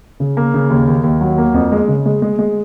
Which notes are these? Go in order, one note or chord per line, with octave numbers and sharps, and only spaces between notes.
C#3
A#3
C#3
D#2
D#2
D#2
F#3
A#3
F2
G#3
C#3
G#3
G#3
G#3